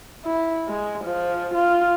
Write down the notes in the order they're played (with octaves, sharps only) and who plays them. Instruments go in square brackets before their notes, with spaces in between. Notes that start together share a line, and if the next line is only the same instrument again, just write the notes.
[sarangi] E4
G#3
F3
F4